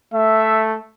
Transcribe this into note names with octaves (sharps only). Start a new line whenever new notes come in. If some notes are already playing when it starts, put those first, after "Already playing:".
A3 E5